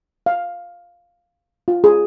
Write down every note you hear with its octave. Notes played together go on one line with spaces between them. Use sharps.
F5
F4
G#4